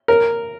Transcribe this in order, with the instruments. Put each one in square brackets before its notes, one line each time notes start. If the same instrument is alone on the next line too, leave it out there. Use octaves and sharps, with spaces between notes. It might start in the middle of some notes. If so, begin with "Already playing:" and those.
[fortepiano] A#4